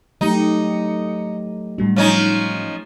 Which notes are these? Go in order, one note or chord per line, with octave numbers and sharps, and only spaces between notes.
F#3 A3 D#4 G4 D#6 C#7
A2 G3 D4 F#4
F3 C#4 D#4